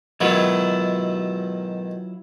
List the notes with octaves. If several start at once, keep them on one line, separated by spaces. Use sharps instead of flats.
G#2 B2 D#3 F#3 E4 F4